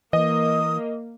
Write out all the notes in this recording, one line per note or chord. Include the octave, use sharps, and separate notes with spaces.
E3 A#3 D#5 D#6